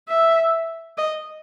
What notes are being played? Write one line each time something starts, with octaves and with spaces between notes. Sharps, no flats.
E5
D#5